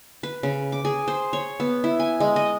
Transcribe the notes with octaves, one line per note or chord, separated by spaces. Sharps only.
B4
C#3
D6
G#4
C5
C#5
B3
E4
G#5
G#3
D#5